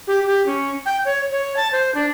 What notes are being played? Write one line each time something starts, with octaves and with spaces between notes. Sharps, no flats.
G4
G4
C#4
G5
C#5
C#5
A5
C5
D4